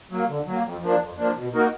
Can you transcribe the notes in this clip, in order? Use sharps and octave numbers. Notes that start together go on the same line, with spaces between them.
F#3 A#3
D3
F#3 A#3
F2
F3 A#3 D4
F2
F3 A#3 D4
B2
A#3 D#4 F#4 A#4